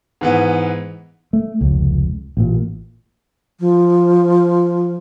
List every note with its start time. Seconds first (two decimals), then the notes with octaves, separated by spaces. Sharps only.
0.21 G#2 E3 B3
1.33 A3
1.61 F1 C#2
2.37 A1 A#2
3.60 F3